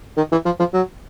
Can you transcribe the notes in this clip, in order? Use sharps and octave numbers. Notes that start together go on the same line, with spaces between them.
D#3
E3
F3
F3
F#3